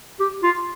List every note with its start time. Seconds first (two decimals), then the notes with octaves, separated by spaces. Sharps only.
0.20 G4
0.43 F4